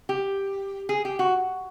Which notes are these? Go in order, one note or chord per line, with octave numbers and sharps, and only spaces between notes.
G4
G#4
G4
F#4